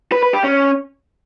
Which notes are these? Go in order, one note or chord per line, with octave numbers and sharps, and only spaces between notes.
B4
B4
G4
C#4